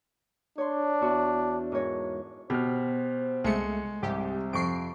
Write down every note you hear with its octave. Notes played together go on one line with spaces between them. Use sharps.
D4 C#5 C6
E2 F#4
G#2 A#4 C#5
B2 G4 C5 F6
C2 G#3 A3 C#7
C2 C3 G4
F2 C#6 C7 D7